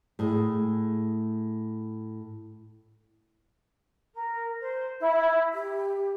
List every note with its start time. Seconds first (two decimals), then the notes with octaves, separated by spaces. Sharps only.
0.19 A2 G#4
4.13 A#4
4.60 C5
4.99 E4
5.54 G4